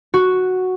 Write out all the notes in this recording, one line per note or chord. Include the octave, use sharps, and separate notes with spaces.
F#4